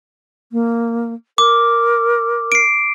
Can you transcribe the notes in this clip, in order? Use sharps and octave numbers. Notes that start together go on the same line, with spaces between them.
A#3
A#4 D6
C7 D7